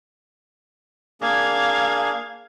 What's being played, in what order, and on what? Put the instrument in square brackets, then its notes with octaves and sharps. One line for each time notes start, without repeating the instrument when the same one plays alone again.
[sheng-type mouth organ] A#3 D4 G#4 [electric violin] F5 G#6